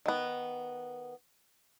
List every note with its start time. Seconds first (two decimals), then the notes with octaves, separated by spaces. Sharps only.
0.06 D#3 B3